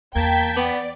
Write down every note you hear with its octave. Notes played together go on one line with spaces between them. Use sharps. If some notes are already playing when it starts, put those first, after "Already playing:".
E2 A#3 G5 A5 G6 G#6 B6
B3 D5